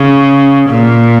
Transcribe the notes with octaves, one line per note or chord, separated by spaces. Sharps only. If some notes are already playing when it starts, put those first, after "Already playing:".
Already playing: C#3
A#2